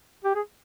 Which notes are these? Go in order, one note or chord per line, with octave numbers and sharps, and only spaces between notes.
G4
G#4